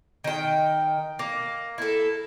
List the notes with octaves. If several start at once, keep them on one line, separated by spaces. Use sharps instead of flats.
D#3 G5
A#3
E4 A4